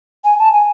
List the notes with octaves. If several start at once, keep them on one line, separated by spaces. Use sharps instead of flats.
G#5
A5
G#5